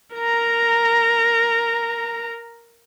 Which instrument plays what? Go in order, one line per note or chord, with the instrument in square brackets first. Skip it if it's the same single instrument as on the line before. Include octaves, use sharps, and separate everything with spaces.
[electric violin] A#4 A#5